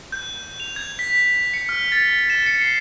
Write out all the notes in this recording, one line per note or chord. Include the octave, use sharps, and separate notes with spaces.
G6
F7
G#6
B6
C#7
F6
A6
E7
C#7
C7